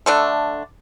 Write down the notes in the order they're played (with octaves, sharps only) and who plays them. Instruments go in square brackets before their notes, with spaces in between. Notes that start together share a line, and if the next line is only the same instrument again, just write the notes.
[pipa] D3 A3 D4